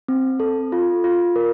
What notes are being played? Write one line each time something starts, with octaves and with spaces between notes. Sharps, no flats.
C4
A4
F4
F4
A#4